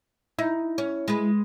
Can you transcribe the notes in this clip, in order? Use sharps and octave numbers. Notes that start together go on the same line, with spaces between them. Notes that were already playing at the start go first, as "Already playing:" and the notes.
D#4 E4
C#4
G#3 B4